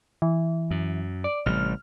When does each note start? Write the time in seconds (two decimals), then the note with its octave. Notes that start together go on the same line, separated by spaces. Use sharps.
0.22 E3
0.71 F#2
1.24 D5
1.46 A1 C3 G3 F6